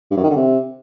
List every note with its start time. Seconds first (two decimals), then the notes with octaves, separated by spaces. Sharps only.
0.11 G2
0.17 F#2
0.24 D#3
0.30 D3
0.36 C3